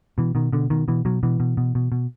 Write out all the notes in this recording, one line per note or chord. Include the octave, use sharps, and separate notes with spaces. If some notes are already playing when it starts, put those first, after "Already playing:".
B2 E3
B2 D#3
B2 D3
B2 D#3
B2 E3
B2 F#3
B2 E3
B2
B2
B2
B2